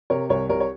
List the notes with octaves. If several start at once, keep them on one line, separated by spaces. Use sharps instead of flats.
C3 A#4 C#5
C2 A#4 C#5
C2 A#4 C#5
C#5